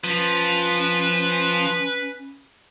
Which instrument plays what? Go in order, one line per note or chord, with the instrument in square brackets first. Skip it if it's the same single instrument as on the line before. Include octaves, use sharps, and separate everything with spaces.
[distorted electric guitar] F3 [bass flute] C#4 [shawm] B4